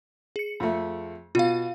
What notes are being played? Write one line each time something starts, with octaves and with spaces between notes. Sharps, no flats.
G#4 C#7
F2 A3
B2 F4 F5